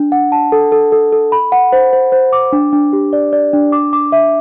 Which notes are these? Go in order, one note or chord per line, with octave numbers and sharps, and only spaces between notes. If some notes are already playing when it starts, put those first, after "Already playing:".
Already playing: D4
F#5
A5
A4
A4
A4
A4
B5
F#5
C5
C5
C5
D6
D4
D4
G4
D5
D5
D4
D6
D6
E5